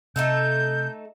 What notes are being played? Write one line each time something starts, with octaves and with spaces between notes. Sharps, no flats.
C3 A3 D#4 A4 G6